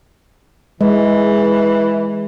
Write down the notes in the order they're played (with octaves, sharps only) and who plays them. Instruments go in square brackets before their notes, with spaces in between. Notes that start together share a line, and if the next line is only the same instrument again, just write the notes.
[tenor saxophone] E3 [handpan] G#3